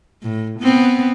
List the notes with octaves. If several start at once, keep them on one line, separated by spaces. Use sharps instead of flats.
A2
B3 C4